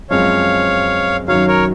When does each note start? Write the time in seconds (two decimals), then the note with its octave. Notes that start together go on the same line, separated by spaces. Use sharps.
0.10 F#2 F3 G#3 C4 C#5 F5
1.28 F#2 D#3 F#3 C#5 F5
1.48 A#4 C#5